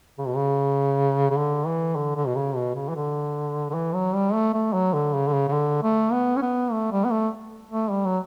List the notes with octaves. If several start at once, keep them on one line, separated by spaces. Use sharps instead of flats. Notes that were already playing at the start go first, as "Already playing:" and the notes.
C#3
B2
C#3
C#3
D3
E3
D3
D3
B2
C#3
B2
C#3
E3
D3
D3
E3
F#3
G3
A3
A3
F#3
D3
C#3
D3
C#3
C#3
D3
A3
B3
C#4
B3
A3
G3
B3
A3
A3
G3
F#3